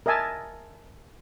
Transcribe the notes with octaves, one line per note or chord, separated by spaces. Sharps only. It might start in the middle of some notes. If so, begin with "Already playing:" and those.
A#4 D#5 E5 G#5 A5